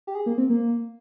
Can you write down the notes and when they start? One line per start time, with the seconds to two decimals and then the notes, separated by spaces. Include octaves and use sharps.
0.07 G4
0.15 G#4
0.26 A#3
0.38 C4
0.50 A#3